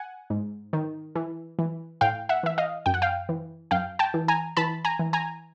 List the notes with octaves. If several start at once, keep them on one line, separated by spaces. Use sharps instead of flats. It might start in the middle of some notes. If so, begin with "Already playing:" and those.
Already playing: F#5 G#5
G#2
D#3
E3
E3
A2 F5 G5
E5 F#5
E3 E5
D#5 F5
F#2 G5
F#5
F5 G5
E3
F#2 F5 G5
G5 A5
E3
G#5 A#5
E3 A5 B5
G#5 A#5
E3
G#5 A#5